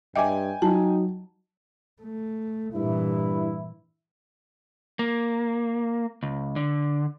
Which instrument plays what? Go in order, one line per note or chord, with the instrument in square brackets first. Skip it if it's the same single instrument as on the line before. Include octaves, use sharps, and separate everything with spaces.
[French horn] G2 [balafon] D#5 E5 D6 [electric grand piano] G5 G#5
[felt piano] F#3 [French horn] D#4 [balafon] A5
[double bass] A3
[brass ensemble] G2 E4 [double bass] A#2 E3
[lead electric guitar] A#3
C#2
D3